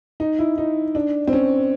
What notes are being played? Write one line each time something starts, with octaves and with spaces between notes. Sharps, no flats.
D#4
E4
D#4
D4
C4
C#4